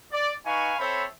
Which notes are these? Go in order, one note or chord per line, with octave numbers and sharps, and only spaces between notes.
D5
D#4 B4 F5 G#5 C#6
C4 A4 C5 C#5 E5 B5